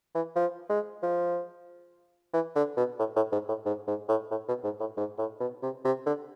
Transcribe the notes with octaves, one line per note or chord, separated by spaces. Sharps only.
E3
F3
G#3
F3
E3
D3
B2
A2
A2
G#2
A2
G#2
G#2
A2
A2
B2
G#2
A2
G#2
A2
B2
C3
C3
D3